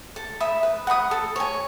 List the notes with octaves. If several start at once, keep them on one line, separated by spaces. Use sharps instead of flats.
A4
E5 B5 D#6
B4
F#5 B5 D#6
A4
C#5 G#5